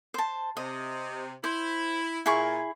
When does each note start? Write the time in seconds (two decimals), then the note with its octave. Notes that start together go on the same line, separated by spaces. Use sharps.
0.14 C5 A5
0.57 C3 D#5
1.44 E4 C5
2.26 A#2 E4 G#4 C#6